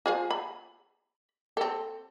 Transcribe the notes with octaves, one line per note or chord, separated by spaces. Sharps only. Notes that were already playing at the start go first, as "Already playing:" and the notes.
F4 G#4 C5
B5
C4 A4